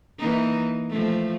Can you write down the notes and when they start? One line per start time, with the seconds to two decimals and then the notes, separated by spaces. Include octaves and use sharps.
0.19 E3 A#3 D#4
0.90 F3 A3